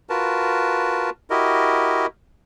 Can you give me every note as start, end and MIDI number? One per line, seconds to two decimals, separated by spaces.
0.10 1.10 65
0.10 1.10 66
0.10 1.10 70
0.10 1.10 71
0.10 1.10 81
1.30 2.06 64
1.30 2.06 66
1.30 2.06 67
1.30 2.06 70
1.30 2.06 75